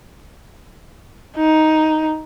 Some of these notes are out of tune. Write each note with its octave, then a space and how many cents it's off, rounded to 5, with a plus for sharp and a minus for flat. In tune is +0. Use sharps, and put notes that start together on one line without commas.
D#4 +5